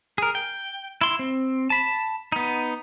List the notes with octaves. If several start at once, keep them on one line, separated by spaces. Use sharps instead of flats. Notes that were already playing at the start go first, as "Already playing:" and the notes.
G#4 A#4
G5
E4 C6
C4
A5 B5
B3 D#4